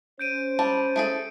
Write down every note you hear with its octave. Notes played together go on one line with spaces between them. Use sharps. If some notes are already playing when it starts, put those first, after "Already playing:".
C#4 C5 G6 D7 D#7
G3 A5
A3 G#4 A4 D7